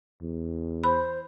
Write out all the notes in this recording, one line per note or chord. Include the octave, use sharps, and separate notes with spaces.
E2
C5 B5